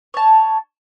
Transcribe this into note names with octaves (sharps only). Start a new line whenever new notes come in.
C#5 A5